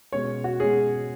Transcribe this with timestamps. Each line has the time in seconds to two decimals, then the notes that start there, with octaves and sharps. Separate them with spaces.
0.12 B2 G#3 C#4 C#5
0.44 F#4
0.60 B2 G#3 C#4 G#4